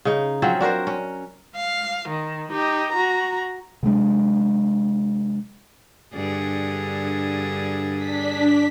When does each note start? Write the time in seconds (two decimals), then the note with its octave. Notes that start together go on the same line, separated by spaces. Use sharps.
0.05 C#3 D#4
0.42 F3 F#3 C4 C#4
0.60 D4 F#4 A#4 C5
0.87 C#4
1.56 F5
2.08 D#3
2.52 D#4 G4
2.92 F#4 A#5
3.83 C3 F#3 G#3 D4
6.14 G2 D3 G#4
7.97 D4 B6